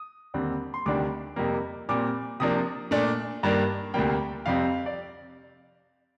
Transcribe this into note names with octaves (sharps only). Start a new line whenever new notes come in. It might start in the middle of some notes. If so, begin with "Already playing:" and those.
Already playing: D#6
D#2 D3 G3 C4
C6
D2 C3 D#3 G3 D4 D6
F2 C3 G3 A#3
A#2 G3 C4 D6
C3 F3 A#3 D4 D#6
A#2 A3 D4
G2 D#3 A#3 D4
D2 C3 G3 A#3 G5
F2 C3 G3 C4 F5
D5